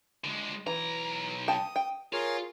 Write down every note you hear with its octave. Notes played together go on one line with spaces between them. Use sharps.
D3 G#3
B1 E3 A#5
G5 A5 D#6
G5
F4 G#4 A#4 C#5